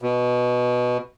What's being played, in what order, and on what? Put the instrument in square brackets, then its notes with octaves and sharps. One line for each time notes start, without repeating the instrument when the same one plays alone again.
[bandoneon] B2